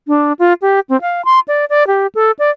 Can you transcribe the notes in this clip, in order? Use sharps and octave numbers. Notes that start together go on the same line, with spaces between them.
D4
F4
G4
C4
F5
C6
D5
D5
G4
A4
D5